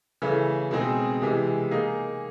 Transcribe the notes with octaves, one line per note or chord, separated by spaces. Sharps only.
C#3 E3 A3
B2 G#3 C4 D#4 G#4
C3 E3 G#3
A#3 D#4 G#4